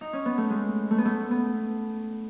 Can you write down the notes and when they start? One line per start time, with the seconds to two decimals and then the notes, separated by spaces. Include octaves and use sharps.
0.01 D#4
0.13 C#4
0.26 B3
0.38 A3
0.50 G#3
0.91 A3
0.98 B3
1.05 A3
1.31 B3